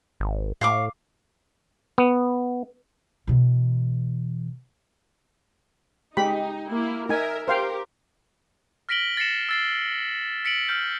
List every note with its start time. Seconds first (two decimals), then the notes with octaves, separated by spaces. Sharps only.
0.20 G#1
0.61 A2 F5 C#6 D6
1.98 B3
3.27 B2 E3
6.17 G#3 D#4 G4 B5
6.70 A#3 E4
7.09 D#4 A#4 E5 G#5
7.48 G4 A#4 C5 F5 G5
8.89 F6 A#6 B6 D7 F#7 G7
9.17 A6 A#6 C7 C#7 E7
9.49 E6 A6 C7
10.45 B6 C#7 D7 F#7
10.69 F6 G6